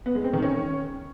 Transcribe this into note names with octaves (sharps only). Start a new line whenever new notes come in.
B3
G#3
C4
D#3
C#4